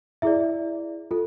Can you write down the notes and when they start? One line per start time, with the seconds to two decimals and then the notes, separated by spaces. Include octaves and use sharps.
0.22 E4 G#4 D5 E5
1.11 F4 A4